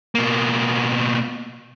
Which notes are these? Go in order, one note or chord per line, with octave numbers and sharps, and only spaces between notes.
B2 A#3